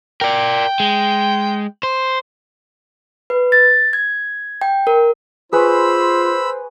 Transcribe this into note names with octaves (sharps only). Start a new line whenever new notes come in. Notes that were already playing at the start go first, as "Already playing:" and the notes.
A#4 D5 G5
G#3
C5
B4
A6
G#6
G5
A#4
F4 G#4 B4 C5 B5 C#6 E6